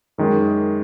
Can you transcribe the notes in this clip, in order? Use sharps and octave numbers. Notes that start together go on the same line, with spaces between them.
F#2 D#3 G#3